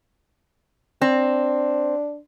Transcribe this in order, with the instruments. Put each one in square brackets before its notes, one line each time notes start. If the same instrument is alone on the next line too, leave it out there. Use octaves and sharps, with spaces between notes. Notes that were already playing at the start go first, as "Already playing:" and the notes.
[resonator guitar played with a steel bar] C4 [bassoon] D4